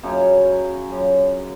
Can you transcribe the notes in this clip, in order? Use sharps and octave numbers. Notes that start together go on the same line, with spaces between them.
F#2 C#3 F#3
F#2 C#3 F#3